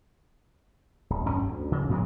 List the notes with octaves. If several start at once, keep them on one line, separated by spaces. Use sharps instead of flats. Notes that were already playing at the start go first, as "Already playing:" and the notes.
D1
F#2 C#4
D2
C#3
A2 F3 F#3 G#3